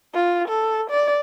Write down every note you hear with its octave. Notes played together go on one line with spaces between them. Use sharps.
F4
A4
D5